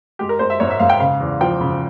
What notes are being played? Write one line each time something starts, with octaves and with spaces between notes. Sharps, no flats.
G#3 G4
A#4
G#3 C5
E5
G#2 C#5
E5
G#2 F5
G5
C#3 F5
E2
F3 G5
C#3